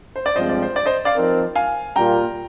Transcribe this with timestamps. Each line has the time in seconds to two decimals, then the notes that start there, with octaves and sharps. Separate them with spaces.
0.16 C5
0.26 D5
0.35 G2 F3 G#3 C4 C5 D#5
0.49 D5
0.62 C5
0.76 D5
0.86 C5 D#5
1.05 D5 F5
1.16 F3 C4 D#4 A#4
1.55 F5 G#5
1.96 A#2 G3 A#3 F4 G5 A#5